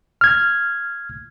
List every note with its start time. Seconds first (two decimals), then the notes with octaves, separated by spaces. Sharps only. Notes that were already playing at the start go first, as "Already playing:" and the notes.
0.21 F6 G#6